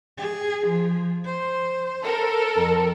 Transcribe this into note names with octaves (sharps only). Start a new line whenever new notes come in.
G#4
F3
C5
A4 A#4
F2